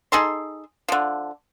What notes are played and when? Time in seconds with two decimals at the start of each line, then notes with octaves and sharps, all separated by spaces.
0.12 D#4 G#4 A4 C6
0.89 D3 F3